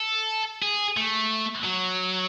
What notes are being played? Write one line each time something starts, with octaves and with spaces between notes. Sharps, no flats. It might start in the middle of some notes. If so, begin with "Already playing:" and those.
Already playing: A4
G#4
A3
F#3